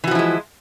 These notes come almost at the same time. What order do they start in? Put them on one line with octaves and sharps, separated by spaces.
E3 F#4 F3 E4 G#3